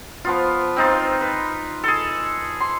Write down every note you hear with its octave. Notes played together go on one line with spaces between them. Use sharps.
F3 B3 F4
C4 D#4 F4
B4
G#4 A4
C6